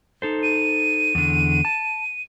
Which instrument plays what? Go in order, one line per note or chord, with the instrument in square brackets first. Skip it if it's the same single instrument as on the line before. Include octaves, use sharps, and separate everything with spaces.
[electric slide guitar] D#4 A4 C5
[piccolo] D#7
[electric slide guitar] E2 D3
A5